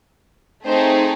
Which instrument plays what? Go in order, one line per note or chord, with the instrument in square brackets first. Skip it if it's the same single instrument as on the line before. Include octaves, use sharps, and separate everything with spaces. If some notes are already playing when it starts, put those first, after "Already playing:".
[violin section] A3 C4 D#4 G#4 C5